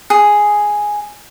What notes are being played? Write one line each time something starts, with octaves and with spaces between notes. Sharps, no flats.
G#4